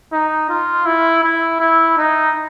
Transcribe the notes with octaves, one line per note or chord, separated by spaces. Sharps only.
D#4
F4
E4
E4
E4
D#4